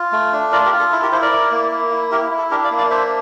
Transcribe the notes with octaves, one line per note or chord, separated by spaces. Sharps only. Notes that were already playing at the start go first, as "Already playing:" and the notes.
Already playing: F4
A3
D4
F4 A#4 D5
G4 A#4
F4
A4
E4 A4
G4 A#4
E4 A4 C5
A#4 D5
E4
A#3
A#3
E4
E4 G4 A#4
E4
A4
D4 G4 A#4
D5 F5
A#3
D5 F5
D4 C5 E5